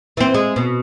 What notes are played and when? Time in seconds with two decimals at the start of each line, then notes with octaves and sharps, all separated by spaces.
0.17 E3 C4
0.34 G#3
0.56 B2